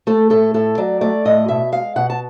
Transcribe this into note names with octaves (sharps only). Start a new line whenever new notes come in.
A3 A4
A2 A4
A2 A4
F#3 D5
A3 D5
A2 D#5
B2 E5
G#3 F5
B2 F#5
A5